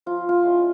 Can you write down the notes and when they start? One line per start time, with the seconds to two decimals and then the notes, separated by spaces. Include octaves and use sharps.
0.06 F3 F4
0.29 F4
0.44 G#3 C#4 E4